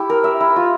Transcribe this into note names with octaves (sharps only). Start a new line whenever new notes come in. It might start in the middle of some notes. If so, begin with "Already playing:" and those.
Already playing: E4 G4
A#4
E5
E4
F4